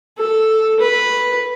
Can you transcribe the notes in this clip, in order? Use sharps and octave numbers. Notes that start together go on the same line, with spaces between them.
A4
B4